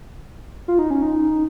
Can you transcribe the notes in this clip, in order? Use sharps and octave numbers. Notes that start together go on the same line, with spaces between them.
F4
D#4
C#4
D#4